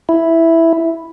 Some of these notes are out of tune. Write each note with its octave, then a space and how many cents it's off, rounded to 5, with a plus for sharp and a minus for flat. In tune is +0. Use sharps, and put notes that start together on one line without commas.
E4 +0